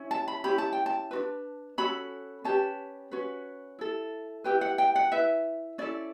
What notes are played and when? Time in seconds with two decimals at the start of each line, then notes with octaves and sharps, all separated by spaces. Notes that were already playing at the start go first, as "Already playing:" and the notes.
Already playing: C#4 E4
0.11 A5
0.28 B5
0.44 C#4 E4 G4 B5
0.58 A5
0.73 G5
0.86 A5
1.11 D4 F#4 B4
1.78 C#4 F#4 A4 B5
2.44 C#4 G4 B4 A5
3.11 C#4 F#4 B4
3.79 E4 A4
4.44 E4 G4 B4 G5
4.61 F#5
4.78 G5
4.95 F#5
5.12 E4 B4 E5
5.78 C#4 E4 A4 D5